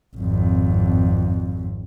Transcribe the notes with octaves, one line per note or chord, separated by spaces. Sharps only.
G#1 F2